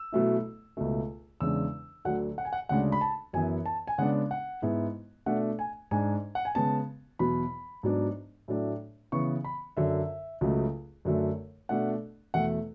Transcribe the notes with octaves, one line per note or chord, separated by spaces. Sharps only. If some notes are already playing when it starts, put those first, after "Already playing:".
Already playing: E6
B2 F#3 A3 E4
C#2 B2 A3
E2 C#3 G#3 D4 E6
D2 D3 F#3 F#5
F#5
G#5
F#5
D2 C#3 G#3 D4 F#5
B5
A5
F#2 E3 B3 E4 G#5
A5
G#5
C#3 G#3 B3 D4 F#5
F#5
G#2 G#3 B3 E4
B2 A3 D4 F#5
G#5
G#2 G#3 D4 G#5
F#5
G#5
C#3 G#3 B3 A5
E2 B2 F#3 B5
G#2 F#3 B3 D4
A2 F#3 A3 D4
C#3 E3 B3 C#6
B5
F#2 D3 F#3 E5
C#2 C#3 F#3 A3
F#2 D3 F#3 A3
B2 A3 D4 F#5
E2 B2 A3 F#5